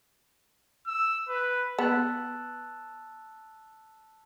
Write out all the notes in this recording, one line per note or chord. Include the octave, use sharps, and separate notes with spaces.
E6
B4
B3 A5 E6 F#6